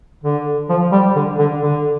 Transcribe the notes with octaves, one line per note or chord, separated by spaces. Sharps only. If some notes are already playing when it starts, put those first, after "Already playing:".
D3
F3
G3
D3
D3
D3